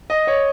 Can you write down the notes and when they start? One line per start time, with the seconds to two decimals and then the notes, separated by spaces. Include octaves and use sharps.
0.10 D#5
0.27 C#5